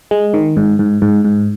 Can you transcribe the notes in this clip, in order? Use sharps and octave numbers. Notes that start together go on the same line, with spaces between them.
G#3
D#3
G#2
G#2
G#2
G#2